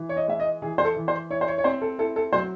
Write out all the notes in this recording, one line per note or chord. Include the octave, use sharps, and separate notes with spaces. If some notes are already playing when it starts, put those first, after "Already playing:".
Already playing: E3
C#5
D#5
G#3 E5
D#5
E3 G#4
C5
A4
E3
C5
E4 C#5
C5
C#5
C#5
C4 C5
A4
E4 A4
A4
F#3 C5